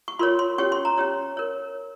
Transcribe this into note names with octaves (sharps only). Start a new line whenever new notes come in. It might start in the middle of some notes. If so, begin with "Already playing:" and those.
C#6
F4 A#4 C#5 C6
C6
C#4 G4 C#5 C#6
C6
A#5
C#4 G4 C#5
A#4 C#5